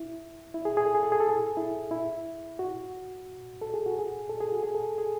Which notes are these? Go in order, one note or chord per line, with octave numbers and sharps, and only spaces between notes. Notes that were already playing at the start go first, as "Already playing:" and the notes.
Already playing: E4
E4
G#4
G#4
A4
G#4
A4
G#4
A4
G#4
E4
E4
F#4
A4
G#4
F#4
G#4
A4
G#4
F#4
G#4
A4
G#4